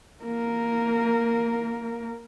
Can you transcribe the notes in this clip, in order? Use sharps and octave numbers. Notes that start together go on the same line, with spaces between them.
A#3 A#4